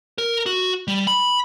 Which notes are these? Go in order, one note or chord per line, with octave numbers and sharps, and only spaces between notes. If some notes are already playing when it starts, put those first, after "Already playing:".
A#4
F#4
G3
B5